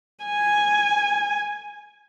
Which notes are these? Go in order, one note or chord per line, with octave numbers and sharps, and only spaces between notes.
G#5